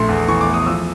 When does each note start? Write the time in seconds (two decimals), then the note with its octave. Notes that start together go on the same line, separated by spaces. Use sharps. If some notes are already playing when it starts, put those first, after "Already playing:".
Already playing: A#1 A3 C6
0.09 E2
0.28 E3 C#6
0.41 D6
0.48 A3
0.54 D#6
0.66 F3 E6